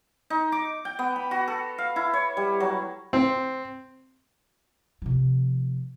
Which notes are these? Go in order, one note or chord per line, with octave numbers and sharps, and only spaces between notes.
D#4
D6
G5
B3
B5
F#4
A4
F5
E4
C#5
G3
F#3
C4
C3 F3